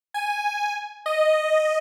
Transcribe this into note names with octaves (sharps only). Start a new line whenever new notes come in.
G#5
D#5